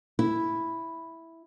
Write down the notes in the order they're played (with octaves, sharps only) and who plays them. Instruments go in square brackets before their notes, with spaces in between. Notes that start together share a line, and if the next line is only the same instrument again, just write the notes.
[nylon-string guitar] E4